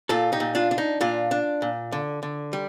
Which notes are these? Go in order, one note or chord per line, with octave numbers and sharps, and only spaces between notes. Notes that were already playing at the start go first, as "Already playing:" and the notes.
A#2 F4 A4
D#4 G4
A#2
D4 F4
D4
D#4
A#2 D4 F4
D4
A#2
D3
D3
G3